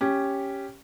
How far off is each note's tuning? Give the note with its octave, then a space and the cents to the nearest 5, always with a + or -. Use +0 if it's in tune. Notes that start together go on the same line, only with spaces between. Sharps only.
C#4 +0 G4 +0